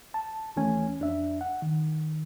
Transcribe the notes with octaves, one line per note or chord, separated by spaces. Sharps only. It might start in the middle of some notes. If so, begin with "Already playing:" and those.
A5
D#2 E3 A3 C#4 G#5
F2 D4 E5
F#5
D#3